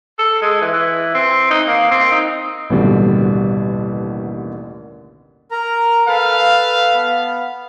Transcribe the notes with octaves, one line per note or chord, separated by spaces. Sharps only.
A4
G#3
E3
E3
C4
D#4
A#3
C4
D#4
A1 D#2 B2 D3 G3
A#4 A#5
A4 B4 F5
B3